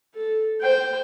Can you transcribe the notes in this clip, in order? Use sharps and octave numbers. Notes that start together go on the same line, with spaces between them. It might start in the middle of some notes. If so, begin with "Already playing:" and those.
A4
C5 G5